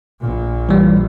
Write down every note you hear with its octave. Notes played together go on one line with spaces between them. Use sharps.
A#1 A#2
E3 G3